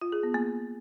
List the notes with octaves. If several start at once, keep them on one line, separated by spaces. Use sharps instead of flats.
F4
G#4
B3
A#3